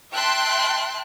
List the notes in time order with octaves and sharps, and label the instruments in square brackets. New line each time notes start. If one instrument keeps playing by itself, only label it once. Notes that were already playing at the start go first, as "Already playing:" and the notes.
[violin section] E5 G5 A5 C6 F#6